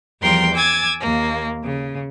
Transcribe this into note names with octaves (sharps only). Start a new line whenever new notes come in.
E2 F3 G3 A#4 G5 C6
G#5 D6 E6 G#6 A6
D#2 A#3
C#3